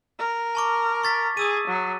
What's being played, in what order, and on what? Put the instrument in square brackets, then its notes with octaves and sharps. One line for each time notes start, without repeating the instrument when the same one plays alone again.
[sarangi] A#4
[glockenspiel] A5 C#6 D6
C#6 A6 B6
[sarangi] G#4 [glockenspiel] D#6 E6 D#7
[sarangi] F#3